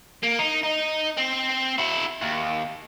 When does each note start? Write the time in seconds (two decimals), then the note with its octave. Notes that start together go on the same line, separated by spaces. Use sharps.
0.23 A#3
0.39 D#4
0.63 D#4
1.17 C4
1.78 E4 F#4
2.22 D#2